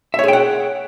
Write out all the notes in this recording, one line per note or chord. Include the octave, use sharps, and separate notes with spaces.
G#4 C#5 E5 F#5 G5